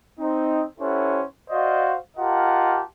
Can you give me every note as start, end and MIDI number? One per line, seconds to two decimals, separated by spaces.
0.19 0.62 60
0.19 0.62 63
0.79 1.22 61
0.79 1.22 64
0.79 1.22 67
0.79 1.22 69
0.79 1.22 72
0.79 1.22 78
1.50 1.94 66
1.50 1.94 72
1.50 1.94 74
1.50 1.94 75
1.50 1.94 77
2.17 2.82 65
2.17 2.82 67
2.17 2.82 70
2.17 2.82 75
2.17 2.82 78
2.17 2.82 81